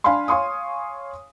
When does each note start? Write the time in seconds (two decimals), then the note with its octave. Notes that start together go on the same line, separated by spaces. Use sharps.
0.04 D4 F5 G#5 B5 C6
0.28 C#5 F5 G#5 C6 C#6 D#6